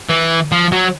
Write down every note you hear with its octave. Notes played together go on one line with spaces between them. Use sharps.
E3
F3
F#3